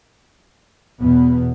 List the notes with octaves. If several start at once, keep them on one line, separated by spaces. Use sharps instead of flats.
E2 B2 B3